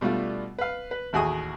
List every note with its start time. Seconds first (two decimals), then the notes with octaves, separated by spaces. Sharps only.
0.01 B2 G3 A3 D4 F4
0.59 B4 F5
0.91 B4
1.13 A1 D#2 F#4 G#4 G#5 D#6